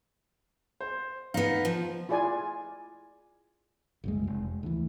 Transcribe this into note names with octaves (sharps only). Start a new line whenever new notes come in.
C5
B3 D#4 F5
F3
E4 F4 G#4 D5 G#5
F#1 C2 G#3
F1
D2 E3